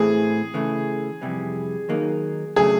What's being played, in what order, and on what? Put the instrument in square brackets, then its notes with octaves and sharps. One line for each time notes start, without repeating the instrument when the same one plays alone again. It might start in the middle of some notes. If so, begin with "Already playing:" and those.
Already playing: [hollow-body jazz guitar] A2 E3 A3 C4 [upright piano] G#4
[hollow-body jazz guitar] C#3 E3 A3
F2 C3 E3 G3
D#3 F#3 A#3 D#4
[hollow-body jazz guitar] C#3 F#3 A3 D4 [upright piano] G#4